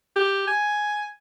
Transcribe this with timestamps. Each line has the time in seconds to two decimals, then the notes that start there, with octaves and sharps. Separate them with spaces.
0.16 G4
0.48 G#5